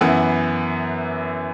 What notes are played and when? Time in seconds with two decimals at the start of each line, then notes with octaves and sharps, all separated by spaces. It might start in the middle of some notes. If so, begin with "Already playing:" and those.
0.01 F#2 E3 B3